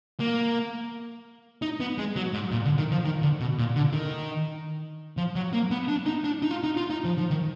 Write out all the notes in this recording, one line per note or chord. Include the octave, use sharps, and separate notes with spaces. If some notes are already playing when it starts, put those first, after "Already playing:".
A#3
D#4
B3
G#3
F#3
G#2
A#2
D3
D#3
F3
D#3
D3
B2
A#2
D3
D#3
F3
F#3
A#3
B3
D4
D#4
D4
D#4
F4
D#4
F4
D#4
F3
F3
D#3